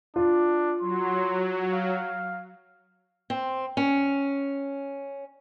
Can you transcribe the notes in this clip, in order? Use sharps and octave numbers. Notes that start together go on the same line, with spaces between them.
D4 F4
F#3 C6
F5
C4
C#4